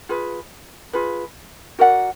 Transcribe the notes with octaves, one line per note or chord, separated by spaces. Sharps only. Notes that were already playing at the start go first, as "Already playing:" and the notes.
F4 G#4 B4
F4 G#4 B4
F#4 A#4 D5 F#5